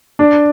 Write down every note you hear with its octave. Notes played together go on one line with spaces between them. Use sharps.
D4